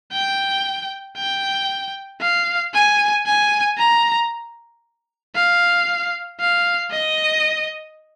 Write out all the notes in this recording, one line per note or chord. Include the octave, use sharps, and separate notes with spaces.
G5
G5
F5
G#5
G#5
A#5
F5
F5
D#5